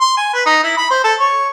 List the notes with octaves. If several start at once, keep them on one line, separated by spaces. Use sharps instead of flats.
C6
G#5
B4
D#4
E4
B5
C5
A4
C#5